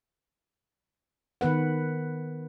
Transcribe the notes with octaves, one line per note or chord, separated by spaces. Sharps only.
D#3 B3 B4 F#5